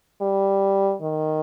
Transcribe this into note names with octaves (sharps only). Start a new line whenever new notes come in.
G3
D#3